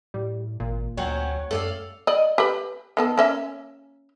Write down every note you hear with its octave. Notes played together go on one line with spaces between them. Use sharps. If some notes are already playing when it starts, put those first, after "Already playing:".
A2 G3
G#1 A#2
D2 F#3 C4 C#4 C#5 F#5 G5
F#2 A3 A4 D5 F5
D5 D#5
G4 B4
D#3 B3 A4
A#3 C#4 E5